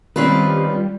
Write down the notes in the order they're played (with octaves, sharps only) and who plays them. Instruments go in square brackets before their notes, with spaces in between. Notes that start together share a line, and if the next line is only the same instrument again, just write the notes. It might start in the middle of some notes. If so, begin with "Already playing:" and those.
[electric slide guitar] D#3 C4 D#4 [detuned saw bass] G3 [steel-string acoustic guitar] C#4 F4 B4